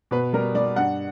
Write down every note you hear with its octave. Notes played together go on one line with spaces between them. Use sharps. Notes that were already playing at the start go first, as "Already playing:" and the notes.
B2 B4
G3 A#4
G3 D5
G2 F#5